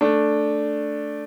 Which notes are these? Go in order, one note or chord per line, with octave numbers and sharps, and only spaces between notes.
A3 D4